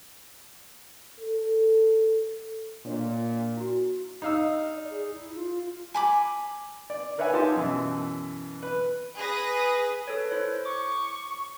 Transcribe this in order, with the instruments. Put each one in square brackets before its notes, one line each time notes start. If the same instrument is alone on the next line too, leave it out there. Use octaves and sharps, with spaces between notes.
[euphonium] A4
[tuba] A#2 [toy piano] D4 C#5 D#5
[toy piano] E4 F#4
[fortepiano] D#4 F5 E6
[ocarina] D#5
D5
G#4
E4
F4
[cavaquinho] G#5 B5 D6
[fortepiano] D5
A#4 B4 C#5 E5 F#5 G#5
D#4 F4 G4 G#5 A5 C6
F#2 B2 E3
B4
[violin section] G#4 B4 D#6 A#6
[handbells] A4 B4 C#5
E4 C5 C#5
[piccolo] C#6 [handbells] D6